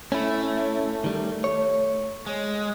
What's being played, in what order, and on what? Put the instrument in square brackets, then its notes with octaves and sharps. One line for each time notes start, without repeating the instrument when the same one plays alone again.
[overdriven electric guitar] A3 [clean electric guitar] C#4 E4
[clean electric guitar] D#3 G3
C#5
[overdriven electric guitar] G#3